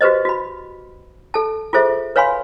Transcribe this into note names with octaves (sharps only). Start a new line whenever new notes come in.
F#4 G4 B4 C5 D#5
F#4 B5
A4 A5
F4 G#4 A4 C5 E5
B4 C#5 F5 G#5 B5 C6